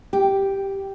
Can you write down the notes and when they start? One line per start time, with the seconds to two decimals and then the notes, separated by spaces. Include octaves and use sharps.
0.13 G4